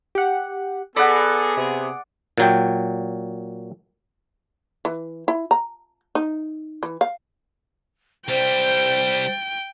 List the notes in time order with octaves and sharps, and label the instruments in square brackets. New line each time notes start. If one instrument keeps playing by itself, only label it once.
[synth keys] G4 F#5
[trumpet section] B3 G#4 [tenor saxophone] A4 [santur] D5 F#5 [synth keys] B5 A#6
[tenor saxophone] C3
[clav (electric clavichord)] A#2 F#3 G5
[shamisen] E3
E4
A#5
D#4
E3
F5
[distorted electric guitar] C2 G3 [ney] C5 [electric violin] G5